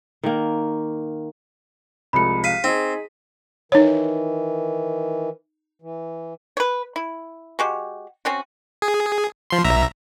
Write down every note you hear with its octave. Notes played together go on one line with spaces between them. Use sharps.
D#3 A#3
C2 F3 G#3 B5 C#7
F5 B6 D#7
C4 D#4 G#4
D#3 E3 D#4 C#5
E3
B4 C#5
E4
G#3 F#4 G4
C4 C#4 F#4
G#4
F3 C6
B1 E5 A#5